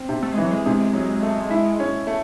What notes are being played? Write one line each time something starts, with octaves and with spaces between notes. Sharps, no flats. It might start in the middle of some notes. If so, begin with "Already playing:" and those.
Already playing: C4
C3
A3
G#3
E3 F#3
G#3
C3
F#3
A3
E4
C#4
A3